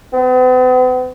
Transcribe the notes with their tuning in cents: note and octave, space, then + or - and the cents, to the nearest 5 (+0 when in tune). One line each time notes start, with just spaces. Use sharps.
B3 +45